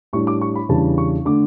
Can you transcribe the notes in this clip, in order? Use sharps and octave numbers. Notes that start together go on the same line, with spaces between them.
A2 G3 D4 C#6
D6
C#6
B5
E2 C#3 G3 D4 A5
C#6
D3 A3 D4 D6